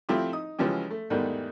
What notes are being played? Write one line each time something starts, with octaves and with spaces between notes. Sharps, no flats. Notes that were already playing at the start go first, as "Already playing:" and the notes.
F3 A3 C4 E4 F4 G4
D#4 D#6
C#3 E3 F3 G#3 C#4 G4
A3
E2 G#2 D#3 G3 A3